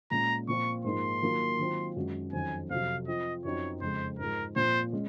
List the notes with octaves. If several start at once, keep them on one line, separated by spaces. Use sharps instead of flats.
A#2 G#3 C#4 A#5
A#2 F3 C4 F4 C#6
G#2 F3 A#3 D#4 C6
D#3 F#3 A#3 F4
D#3 F#3 C4 F4
F#2 D#3 G#3 C#4 F#4
F2 D#3 F#3 C#4 G#5
F2 C3 F#3 F5
F3 C4 F4 D#5
F#2 F3 C4 D#4 F#4 C#5
F2 C#3 G#3 C4 C5
G#2 F3 G#3 A#4
A#2 F3 C4 C5
G#3 C#4